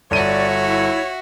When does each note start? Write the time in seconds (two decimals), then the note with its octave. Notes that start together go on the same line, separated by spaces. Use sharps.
0.11 G1 F#4 C#5 D5 E5 D#7
0.67 E4